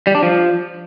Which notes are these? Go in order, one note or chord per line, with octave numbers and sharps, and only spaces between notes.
G3
D4
F3